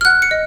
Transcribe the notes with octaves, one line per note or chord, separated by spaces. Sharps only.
F6
F#5 F#6
C#7
D#5